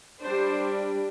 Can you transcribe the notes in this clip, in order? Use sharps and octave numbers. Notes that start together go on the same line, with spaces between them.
G3 D4 C5